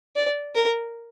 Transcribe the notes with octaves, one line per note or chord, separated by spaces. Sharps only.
D5
A#4